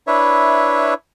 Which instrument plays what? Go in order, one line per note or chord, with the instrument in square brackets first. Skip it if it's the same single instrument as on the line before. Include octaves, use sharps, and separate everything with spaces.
[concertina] D4 E4 B4 C#5 E5